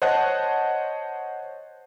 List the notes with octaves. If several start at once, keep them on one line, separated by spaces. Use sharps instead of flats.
C5 C#5 D#5 F#5 A5 F#6